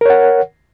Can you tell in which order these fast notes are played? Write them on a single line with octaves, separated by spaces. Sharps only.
A#4 C#5 F#5